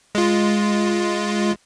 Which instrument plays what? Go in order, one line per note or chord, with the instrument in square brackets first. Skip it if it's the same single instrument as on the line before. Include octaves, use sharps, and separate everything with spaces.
[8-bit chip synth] G#3 F4